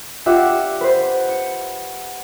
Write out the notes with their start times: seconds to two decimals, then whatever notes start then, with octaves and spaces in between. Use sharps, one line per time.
0.26 D4 F4 G4 E5 F#5
0.81 B4 C5
1.29 C#7